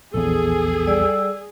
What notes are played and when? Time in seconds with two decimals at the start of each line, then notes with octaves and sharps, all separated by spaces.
0.14 A#1 E2 G#4 A4
0.86 G3 D5 E6